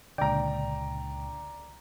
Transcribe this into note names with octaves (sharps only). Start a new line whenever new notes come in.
C#2 A#2 D3 D5 G5 A#5